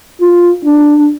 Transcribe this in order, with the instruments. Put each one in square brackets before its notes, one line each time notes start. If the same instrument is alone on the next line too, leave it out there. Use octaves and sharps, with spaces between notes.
[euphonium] F4
D4